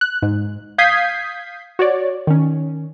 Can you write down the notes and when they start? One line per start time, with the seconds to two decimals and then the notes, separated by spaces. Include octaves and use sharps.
0.01 F#6
0.22 G#2
0.78 F5 D#6 G6 G#6 B6 C7
1.79 F#4 C#5 D5
2.27 D#3 C#4